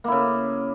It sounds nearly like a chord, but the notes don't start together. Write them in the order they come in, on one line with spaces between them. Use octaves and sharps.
A#3 E4 C#3